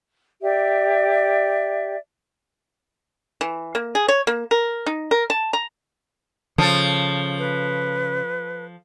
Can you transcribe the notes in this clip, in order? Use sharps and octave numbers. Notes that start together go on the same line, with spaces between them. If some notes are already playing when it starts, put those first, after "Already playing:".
G4 D5 E5
E3
A#3
G#4
C#5
A#3
A#4
D#4
A#4
A5
A#5
C#3 F3 A4
B4